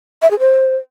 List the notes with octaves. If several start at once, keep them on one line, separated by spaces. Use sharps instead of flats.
E5
G#4
C5